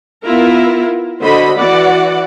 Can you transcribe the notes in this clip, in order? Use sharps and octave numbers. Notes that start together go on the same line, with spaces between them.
B3 E4 F4 A#4
D3 F#4 C5 D#5 B5
E3 F#4 D5 F#5